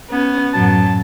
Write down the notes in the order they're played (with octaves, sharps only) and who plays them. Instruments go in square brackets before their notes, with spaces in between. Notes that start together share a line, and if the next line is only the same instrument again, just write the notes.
[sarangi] B3 [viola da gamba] C#4
[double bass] F#2 A2 [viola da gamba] F#3 [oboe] A5